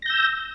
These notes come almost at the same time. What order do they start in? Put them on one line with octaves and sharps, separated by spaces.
A#6 G6 E6